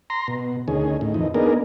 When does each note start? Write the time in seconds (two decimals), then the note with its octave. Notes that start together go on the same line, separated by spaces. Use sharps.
0.10 A#5 C6
0.28 B2
0.68 D2 D#3 C#4 G#4
1.01 A2 D#3
1.14 F2 E3 D#4
1.34 A#3 B3 D4 D#4 G#4 A#4